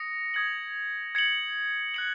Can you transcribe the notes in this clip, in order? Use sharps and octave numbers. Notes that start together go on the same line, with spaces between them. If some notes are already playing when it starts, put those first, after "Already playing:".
Already playing: D#6 A#6 C#7
D#6 G#6 C#7 F#7
G#6 C#7 F#7
F#6 C#7 F#7